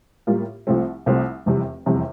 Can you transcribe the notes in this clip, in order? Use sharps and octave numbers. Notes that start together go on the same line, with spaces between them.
A2 G3 A#3 F4
C2 C3 F3 A3 C4
C2 C3 F3 A3 C4
F1 E2 C3 G3
F1 E2 C3 G3